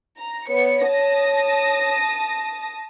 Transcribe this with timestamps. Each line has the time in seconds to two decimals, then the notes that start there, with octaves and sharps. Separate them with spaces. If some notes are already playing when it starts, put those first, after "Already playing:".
0.18 A#5
0.49 B3 C#5 C#7
0.88 A5 D#6 A#6